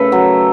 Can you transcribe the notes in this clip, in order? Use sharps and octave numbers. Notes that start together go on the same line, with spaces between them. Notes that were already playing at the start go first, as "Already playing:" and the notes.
Already playing: C#3 A3 A4 B4
F#3